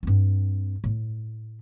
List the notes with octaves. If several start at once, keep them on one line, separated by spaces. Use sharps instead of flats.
G2 C4
A2